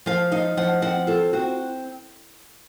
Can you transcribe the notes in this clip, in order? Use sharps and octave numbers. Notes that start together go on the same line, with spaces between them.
F3 F5
D#4 F5
F3 F#5
C4 F#5
F4 A4
C4 F#4